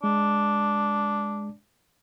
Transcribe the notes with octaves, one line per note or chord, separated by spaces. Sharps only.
G#3 D4